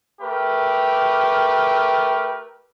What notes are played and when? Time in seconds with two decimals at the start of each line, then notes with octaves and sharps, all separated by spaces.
0.21 A3 G4 A#4 B4